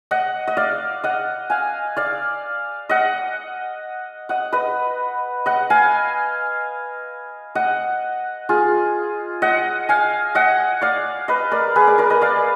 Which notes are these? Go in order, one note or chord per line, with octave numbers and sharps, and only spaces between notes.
D#5 F#5
D#5
D5 F5
D#5 F#5
F5 G#5
D5 F5
D#5 F#5
D#5 F#5
B4 D#5
D#5 F#5
F5 G#5
D#5 F#5
F4 G#4
D#5 F#5
F5 G#5
D#5 F#5
D5 F5
B4 D#5
A#4 D5
G#4 B4
A#4 D5
A#4 D5
B4 D#5
D5 F5